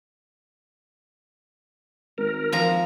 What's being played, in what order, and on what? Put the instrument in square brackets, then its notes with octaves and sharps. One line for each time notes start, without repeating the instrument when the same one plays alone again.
[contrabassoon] G#1 [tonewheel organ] A#4
[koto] F3 A#5